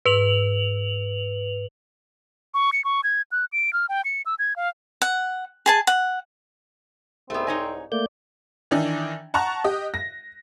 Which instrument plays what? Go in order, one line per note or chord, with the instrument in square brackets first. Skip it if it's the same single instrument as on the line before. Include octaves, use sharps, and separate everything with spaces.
[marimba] G#2 [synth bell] B4 F7 F#7
[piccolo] C#6
C#7
C#6
G#6
F#6
D7
F6
G5
C#7
E6
G#6
F5
[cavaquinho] F#5
G#4 G#5 A5
F#5
[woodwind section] C2 G#2 [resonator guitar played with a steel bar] A3 B3 [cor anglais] C4
[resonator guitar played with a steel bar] D#4 C#5 G#5
[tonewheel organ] A3 A#3 G6 [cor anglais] D5
[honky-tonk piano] D#3 E3 D4 D#4
F#5 A5 A#5 C#6 F#6
G4 D#5
A#6